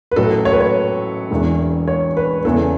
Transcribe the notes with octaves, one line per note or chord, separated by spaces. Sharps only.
B4
A1 A2 F#3 A4
C#5
B4
C#5
E1 E2 E3
C#5
B4
E2 C#3 E3 A4